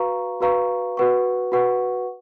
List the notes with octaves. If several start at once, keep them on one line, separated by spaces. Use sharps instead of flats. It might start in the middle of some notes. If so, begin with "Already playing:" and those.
Already playing: F#4 B4 F5 A#5 C#6
F#4 B4 F5 A#5 C#6
F#4 B4 F#5 C#6
F#4 B4 F#5 C#6